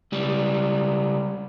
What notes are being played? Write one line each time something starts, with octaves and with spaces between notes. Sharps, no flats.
C#2 G3